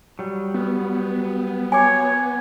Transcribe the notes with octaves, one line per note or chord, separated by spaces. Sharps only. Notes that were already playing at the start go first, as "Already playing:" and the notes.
F#3 G3
B3
C#5 G#5 D6